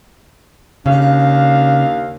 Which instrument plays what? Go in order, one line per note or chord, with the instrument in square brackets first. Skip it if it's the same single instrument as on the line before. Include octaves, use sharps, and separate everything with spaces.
[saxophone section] D#2 D4 F5 [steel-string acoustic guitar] C#3